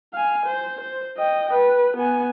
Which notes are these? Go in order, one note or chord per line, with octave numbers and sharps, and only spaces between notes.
F5 G#5
C5
C5
D#5 G5
B4
B3 G#5